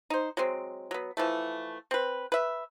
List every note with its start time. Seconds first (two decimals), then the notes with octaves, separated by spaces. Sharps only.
0.10 D#4 C5
0.37 F#3 G#3 C4
0.91 F#3 B3
1.17 E3 F3 A3
1.91 C4 B4
2.32 B4 E5